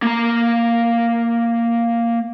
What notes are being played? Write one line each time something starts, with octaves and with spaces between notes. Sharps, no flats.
A#3 A#5